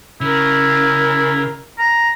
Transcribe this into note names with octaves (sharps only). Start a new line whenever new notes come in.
C#3 E4 A#4
A#5